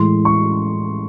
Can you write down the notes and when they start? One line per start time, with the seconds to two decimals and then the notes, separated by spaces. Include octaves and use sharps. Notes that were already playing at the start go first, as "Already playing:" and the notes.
Already playing: A2 E3 G#3 C6
0.25 C#6